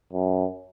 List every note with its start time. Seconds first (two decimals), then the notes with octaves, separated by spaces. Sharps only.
0.13 F#2